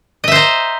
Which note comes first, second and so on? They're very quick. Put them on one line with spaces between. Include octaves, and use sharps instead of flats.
D#5 E5 C5 A#5